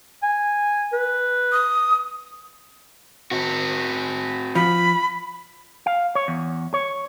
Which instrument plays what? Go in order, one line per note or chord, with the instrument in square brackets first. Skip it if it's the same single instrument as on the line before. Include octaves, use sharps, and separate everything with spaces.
[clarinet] G#5
B4
[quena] D#6
[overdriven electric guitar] C4 F#4
[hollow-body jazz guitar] F3 [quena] B5
[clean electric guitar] F5
C#5
E2
C#5